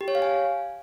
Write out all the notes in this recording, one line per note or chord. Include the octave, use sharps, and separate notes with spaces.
G4
C#5
F5
G#5